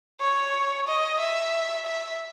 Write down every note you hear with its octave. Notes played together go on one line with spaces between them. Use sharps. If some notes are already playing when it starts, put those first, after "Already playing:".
C#5
D#5
E5
E5